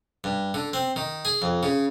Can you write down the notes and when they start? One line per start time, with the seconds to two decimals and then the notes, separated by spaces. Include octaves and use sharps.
0.24 G2
0.54 D3
0.73 C4
0.96 D#3
1.25 G#4
1.42 F2
1.63 C#3